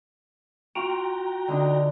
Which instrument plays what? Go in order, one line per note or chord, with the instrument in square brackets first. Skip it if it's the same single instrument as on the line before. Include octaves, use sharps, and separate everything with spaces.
[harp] F4 [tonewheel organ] F#4 G5 A#5
[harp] D3 D4 D#4